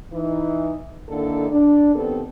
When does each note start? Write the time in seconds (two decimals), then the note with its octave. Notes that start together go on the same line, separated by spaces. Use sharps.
0.13 E3 D#4
1.09 D3 D#3 A#3 D4 E4 A4
1.50 D4
1.95 D#3 B3 C4 G4 A4